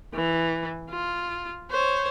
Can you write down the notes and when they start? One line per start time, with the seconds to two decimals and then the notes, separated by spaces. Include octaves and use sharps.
0.14 E3
0.91 F4
1.71 C5 C#5